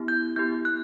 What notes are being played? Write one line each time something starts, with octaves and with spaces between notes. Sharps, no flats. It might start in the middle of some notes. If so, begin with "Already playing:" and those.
Already playing: B3 E4 G4
G6
B3 E4 G4 G6
F#6